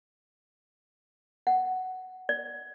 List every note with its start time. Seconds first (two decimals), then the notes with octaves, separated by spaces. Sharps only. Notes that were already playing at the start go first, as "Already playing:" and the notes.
1.47 F#5
2.29 D5